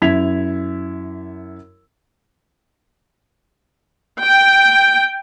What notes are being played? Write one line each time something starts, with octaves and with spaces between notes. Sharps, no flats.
F#2 E4 G#6 B6 F7
G5